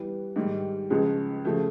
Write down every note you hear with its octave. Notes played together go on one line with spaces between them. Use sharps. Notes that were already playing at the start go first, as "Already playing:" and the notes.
Already playing: E3 G3 B3
G#2 D#3 G3
C#2 C#3 F3 G#3 C#4
C#3 F3 A3